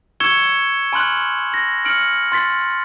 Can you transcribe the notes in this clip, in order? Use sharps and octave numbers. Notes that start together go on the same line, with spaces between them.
C#6 E6 G#6 C#7 E7 G7
G#5 B5 C6 F6 F#6 F#7
A#6 F#7
F6 C#7 D7 F#7
C6 A6 B6